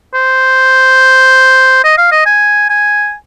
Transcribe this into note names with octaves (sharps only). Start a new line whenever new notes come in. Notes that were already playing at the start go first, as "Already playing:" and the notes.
C5
D#5
F5
D#5
G#5
G#5